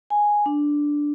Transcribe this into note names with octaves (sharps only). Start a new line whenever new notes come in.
G#5
D4